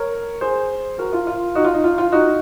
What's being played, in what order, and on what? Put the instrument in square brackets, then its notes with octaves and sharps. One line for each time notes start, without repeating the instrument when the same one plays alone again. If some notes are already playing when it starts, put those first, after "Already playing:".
Already playing: [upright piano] A#4 C#5
G#4 C5
F#4 A#4
F4
F4
D#4 F#4
F4
D#4
F4
F4
D#4 F#4